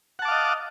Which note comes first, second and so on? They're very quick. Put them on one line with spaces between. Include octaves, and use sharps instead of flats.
F#5 A5 D6 F5 D#5